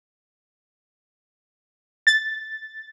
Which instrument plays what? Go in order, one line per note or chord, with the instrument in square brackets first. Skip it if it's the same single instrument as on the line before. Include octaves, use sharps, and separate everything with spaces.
[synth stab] A6